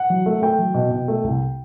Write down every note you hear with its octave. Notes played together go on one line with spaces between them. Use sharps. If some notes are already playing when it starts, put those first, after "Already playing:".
Already playing: F#5
F#3
A3
A3 G5
F#3
B2
B2
A3
C2